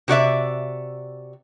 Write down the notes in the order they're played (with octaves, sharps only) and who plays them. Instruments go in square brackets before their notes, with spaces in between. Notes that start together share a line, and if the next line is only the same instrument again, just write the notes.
[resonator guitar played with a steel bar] C3 F#4 D5 E5